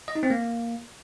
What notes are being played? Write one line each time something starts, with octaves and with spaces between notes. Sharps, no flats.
D#5
D#4
C4
A#3